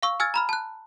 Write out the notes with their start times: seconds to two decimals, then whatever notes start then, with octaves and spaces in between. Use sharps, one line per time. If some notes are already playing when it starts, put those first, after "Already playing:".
0.03 F5 C#6 E6
0.20 G#5 E6 F6 G#6 A6
0.34 A#5 B5 F6
0.49 A5 F#6